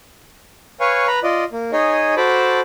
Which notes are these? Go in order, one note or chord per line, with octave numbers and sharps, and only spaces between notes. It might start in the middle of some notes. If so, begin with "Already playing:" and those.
B4 C#5 F5 G#5 C#6
B4 A#5 B5
F4 D5 D#5
A#3
D#4 G#4 C#5 D#5 G#5
F#4 A4 C5 A5 B5 D6